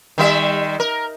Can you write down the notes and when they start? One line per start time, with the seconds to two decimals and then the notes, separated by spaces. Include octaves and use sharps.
0.18 D#3 G3 E5
0.80 A#4